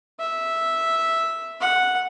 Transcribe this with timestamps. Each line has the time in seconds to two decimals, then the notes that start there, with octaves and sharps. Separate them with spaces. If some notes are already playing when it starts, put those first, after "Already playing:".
0.20 E5
1.60 F#5